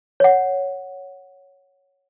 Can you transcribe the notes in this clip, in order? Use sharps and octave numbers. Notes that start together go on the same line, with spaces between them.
C#5 F#5